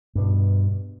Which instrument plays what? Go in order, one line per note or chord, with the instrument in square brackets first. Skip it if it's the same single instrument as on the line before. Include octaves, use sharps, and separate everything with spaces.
[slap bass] G2 B2